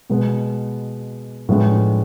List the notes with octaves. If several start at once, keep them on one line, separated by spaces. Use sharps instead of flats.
B2 G#3 B3
A2 F3 G#3 B3 D4